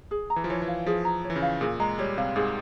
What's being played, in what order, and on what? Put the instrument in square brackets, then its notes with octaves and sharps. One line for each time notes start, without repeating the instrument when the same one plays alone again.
[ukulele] G#4
A#5
[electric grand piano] E3
F3
[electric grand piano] E3 [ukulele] C#5
[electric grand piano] E3
[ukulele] F5
[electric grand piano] F3 [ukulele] G#4
[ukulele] A#5
C#5
[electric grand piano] E3
C#3
[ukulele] F5
[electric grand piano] A#2 [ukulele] G#4
[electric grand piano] G#3 [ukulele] A#5
[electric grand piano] G3 [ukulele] C#5
[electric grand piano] C3 [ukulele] F5
[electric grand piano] G#2 [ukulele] G#4